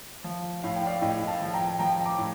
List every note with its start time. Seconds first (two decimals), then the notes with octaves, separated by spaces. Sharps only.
0.24 F3
0.63 A2 F5
0.76 G5
0.86 D5 F5
1.01 A2 D#5 G5
1.27 F5 A5
1.41 F3
1.54 G5 A#5
1.79 F3 G5 A#5
2.05 A#5 D6
2.18 A2